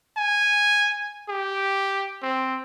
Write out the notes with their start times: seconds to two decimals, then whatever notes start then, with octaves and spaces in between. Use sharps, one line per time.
0.17 G#5
1.29 G4
2.22 C4